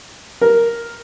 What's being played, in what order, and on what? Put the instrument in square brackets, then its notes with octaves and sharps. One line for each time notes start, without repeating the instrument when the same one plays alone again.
[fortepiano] A#4